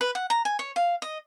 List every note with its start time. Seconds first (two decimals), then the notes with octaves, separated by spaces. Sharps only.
0.01 B4
0.15 F#5
0.30 A#5
0.45 G#5
0.59 C#5
0.76 F5
1.02 D#5